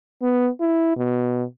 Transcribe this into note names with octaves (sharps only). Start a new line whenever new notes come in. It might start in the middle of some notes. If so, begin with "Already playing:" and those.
B3
E4
B2